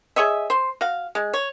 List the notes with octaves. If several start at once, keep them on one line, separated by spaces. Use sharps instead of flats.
G#4 C#5 D#5 E5
C5
F#4 F5
G#3
C#5